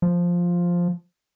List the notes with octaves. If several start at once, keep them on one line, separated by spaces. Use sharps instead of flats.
F3